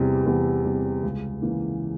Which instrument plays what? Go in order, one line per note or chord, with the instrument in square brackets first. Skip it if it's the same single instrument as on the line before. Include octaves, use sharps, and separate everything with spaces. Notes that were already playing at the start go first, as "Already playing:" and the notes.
Already playing: [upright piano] E2 C3 G3
E2
C3 G3
C#2
C#3 E3 A#3